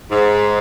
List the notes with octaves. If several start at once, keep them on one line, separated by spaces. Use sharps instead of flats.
G#2